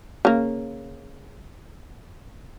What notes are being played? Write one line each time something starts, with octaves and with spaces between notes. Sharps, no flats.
C#3 A#3